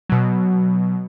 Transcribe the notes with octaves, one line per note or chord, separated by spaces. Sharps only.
B2 F#3